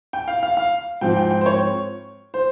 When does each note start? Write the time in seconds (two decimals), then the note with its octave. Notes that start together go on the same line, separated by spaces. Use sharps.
0.13 G5
0.28 F5
0.43 F5
0.57 F5
1.01 G#2 F3 C4 G5
1.17 G5
1.31 G5
1.41 C5
1.46 C#5
2.34 C5